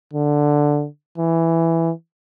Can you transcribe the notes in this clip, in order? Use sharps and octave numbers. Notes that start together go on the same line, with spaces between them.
D3
E3